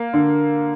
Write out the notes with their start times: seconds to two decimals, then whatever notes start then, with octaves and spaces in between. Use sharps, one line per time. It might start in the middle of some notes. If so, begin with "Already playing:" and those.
Already playing: A#3
0.13 D3